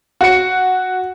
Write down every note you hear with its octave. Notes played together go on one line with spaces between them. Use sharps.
F#4 C#7